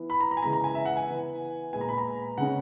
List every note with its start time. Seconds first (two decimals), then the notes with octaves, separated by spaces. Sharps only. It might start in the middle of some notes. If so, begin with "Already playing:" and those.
Already playing: E3 B3
0.10 B5
0.20 A#5
0.31 A#5
0.37 G#5
0.42 C#3 E3 G#3 B3 A#5
0.53 A#5
0.64 G#5
0.75 E5
0.85 F#5
0.97 G#5
1.08 E3 B3
1.73 A#2 G#3 B3 G#5
1.81 A#5
1.89 B5
1.98 A#5
2.38 C#3 G#3 C#4 F#5